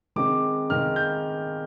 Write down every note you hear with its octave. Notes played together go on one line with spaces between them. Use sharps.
D#3 G#3 C4 D6
D#3 G#3 C4 F6
G6